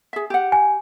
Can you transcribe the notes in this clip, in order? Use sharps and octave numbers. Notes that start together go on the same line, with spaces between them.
G#4 E5
G4 F#5
G#5